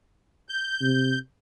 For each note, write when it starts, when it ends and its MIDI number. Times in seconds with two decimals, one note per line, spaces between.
0.49 1.19 91
0.81 1.16 48